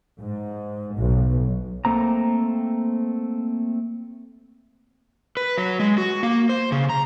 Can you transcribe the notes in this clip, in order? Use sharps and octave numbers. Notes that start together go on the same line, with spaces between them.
G#2
B1
A3 A#3 C4 A#5
B4
F#3
G#3
F#4
A#3
C5
C#3
A#5